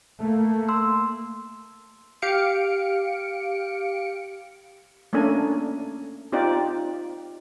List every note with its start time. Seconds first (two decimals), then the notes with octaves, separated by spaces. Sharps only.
0.20 A3 A#3
0.69 C6 E6
2.22 G4 F5 C#7 D7
5.13 A3 A#3 C#4 D4 G#5
6.32 C4 D#4 F4 G4 D5